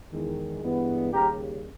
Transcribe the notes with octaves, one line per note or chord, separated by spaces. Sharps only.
E2 D#3 G#3
G2 E3 G#3 B3
D#2 C#3 G3 G4 A#4